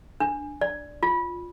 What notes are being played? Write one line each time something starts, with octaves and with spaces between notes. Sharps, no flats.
D4
D5
F4